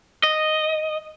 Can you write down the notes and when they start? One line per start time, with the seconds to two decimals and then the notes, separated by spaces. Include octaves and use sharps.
0.23 D#5